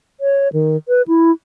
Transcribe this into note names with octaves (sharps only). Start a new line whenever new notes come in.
C#5
D#3
B4
E4